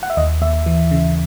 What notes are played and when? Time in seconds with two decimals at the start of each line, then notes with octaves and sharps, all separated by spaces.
0.03 F#5
0.10 E5
0.17 D#2 D#5
0.42 D#2 E5
0.66 E3
0.91 C#3